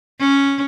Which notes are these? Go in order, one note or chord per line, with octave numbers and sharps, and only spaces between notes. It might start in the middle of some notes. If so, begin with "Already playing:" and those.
C#4